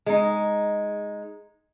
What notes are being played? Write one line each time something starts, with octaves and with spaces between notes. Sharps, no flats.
G#3 D#4